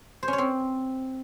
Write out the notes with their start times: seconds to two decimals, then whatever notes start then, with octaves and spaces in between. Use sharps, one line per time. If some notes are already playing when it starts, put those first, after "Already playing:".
0.23 C5
0.28 C#4
0.33 C#5
0.38 C4